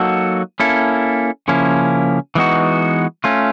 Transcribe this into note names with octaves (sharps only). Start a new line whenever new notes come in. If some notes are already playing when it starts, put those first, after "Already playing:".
Already playing: F#3 A#3 D#4 F#4 A4
A#3 C#4 E4 A4
C#3 F3 A#3 C#4 E4
E3 G#3 B3 D#4 F#4
A3 C#4 F4